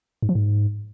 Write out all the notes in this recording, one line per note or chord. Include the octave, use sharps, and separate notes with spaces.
G#2
F3
G#2